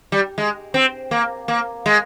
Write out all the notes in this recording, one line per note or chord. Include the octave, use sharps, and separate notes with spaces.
G3
G#3
C4
A#3
A#3
G#3